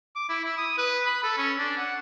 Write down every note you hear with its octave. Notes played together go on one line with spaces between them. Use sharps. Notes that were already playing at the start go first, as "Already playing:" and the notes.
D6
E4
E4
D#6
B4
B5
A4
C#4
D4
F#5